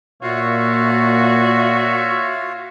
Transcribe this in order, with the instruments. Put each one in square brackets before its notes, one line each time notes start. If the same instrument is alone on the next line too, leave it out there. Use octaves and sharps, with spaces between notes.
[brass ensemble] A#2 [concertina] F4 F5 [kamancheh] F#4 [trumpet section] C#5 E5